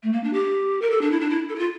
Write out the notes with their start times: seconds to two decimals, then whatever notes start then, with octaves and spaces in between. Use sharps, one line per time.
0.03 A3
0.13 A#3
0.24 D4
0.33 G4
0.82 A#4
0.91 A4
1.01 D4
1.11 E4
1.20 D4
1.30 E4
1.49 A4
1.56 E4
1.59 F4